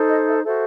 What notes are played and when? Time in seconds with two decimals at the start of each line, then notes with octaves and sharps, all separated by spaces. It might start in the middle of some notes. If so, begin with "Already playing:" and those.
Already playing: D#4 A4 C5
0.08 D#5
0.27 E5
0.45 F#4 A4 C5 E5